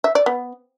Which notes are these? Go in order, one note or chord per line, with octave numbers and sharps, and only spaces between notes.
E5
D5
B3